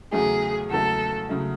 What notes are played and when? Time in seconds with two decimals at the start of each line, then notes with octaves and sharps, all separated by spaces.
0.12 E2 C#3 F#3 A3 G#4
0.71 E2 C#3 F#3 A3 A4
1.29 C#3 F#3 A3